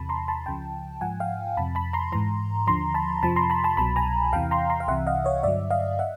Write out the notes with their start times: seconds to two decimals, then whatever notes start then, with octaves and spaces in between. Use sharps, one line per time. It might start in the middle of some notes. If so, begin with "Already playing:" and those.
Already playing: E2 C3 E3 A5 B5
0.09 A#5 C6
0.28 A5 B5
0.46 C#2 C#3 F3 G5 A5
1.01 G#2 F3 F#5 G#5
1.20 F5 G5
1.57 F2 C3 F3 A5 B5
1.75 A5 B5
1.93 A#5 C6
2.12 G#2 E3 A#5 C6
2.67 D#2 D3 F3 A#5 C6
2.94 A5 B5
3.23 F2 C3 F3 A5 B5
3.36 A#5 C6
3.50 A5 B5
3.64 A5 B5
3.77 C2 B2 F#3 A5 B5
3.96 G#5 A#5
4.33 E2 C3 E3 F5 G5
4.51 A#5 C6
4.70 A#5 C6
4.80 F5
4.88 C2 C3 E3 E5 F#5
5.07 D#5 F5
5.25 C#5 D#5
5.43 G2 D3 F#3 D5 E5
5.71 D#5 F5
5.99 E5 F#5